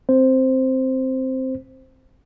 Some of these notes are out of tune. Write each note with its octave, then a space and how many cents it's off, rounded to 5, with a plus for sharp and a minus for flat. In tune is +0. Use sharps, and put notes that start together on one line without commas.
C4 +0 C5 +0